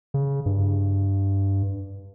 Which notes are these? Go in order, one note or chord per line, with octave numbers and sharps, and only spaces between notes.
C#3
G2